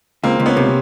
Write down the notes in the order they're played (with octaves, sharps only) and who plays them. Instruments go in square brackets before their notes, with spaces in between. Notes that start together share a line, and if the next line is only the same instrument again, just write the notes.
[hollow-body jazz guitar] C#2 [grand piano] A#3 C4
[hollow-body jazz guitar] C#2
[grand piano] B3 C#4
[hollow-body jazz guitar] C3